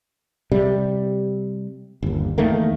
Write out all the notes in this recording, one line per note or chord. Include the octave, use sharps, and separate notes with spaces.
C3 G3
G1 D#2
E2 D#3 A3 A#3